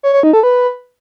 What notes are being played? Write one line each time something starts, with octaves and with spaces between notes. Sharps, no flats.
C#5
C#5
D#4
A4
B4